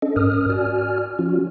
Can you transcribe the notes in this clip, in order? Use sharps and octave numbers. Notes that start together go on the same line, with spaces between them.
C#4 D4 A4 D#5
G#2 C#4 A#4 D#6 F6
F#4 D5 G#5 F6
F3 C#4 F4 F#4